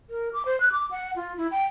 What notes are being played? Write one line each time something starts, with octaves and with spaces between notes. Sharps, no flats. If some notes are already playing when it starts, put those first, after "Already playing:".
A#4
D6
C5
F#6
D6
F#5
F4
E4
G5